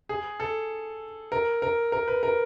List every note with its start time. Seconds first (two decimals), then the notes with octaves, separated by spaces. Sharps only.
0.09 G#4
0.40 A4
1.32 A#4
1.62 A#4
1.92 A#4
2.08 B4
2.23 A#4